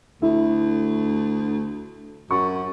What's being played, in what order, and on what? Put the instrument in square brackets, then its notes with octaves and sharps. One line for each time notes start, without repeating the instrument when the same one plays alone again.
[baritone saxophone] D2 [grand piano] E4
[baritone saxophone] F#2 [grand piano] C#6